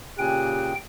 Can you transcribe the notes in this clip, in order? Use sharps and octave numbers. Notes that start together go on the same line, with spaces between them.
A#2 C#3 G4 G5 G#5 F#6